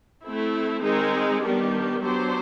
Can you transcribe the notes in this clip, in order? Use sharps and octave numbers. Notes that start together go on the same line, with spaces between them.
A3 C4 E4
D#3 G#3 C4 D#4 G#4
D#3 G3 B3 D4 G4
F#3 B3 D4 G4 C5